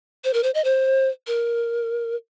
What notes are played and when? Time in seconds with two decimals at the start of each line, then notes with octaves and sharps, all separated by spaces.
0.24 C5
0.33 A#4
0.43 C5
0.54 D#5
0.64 C5
1.27 A#4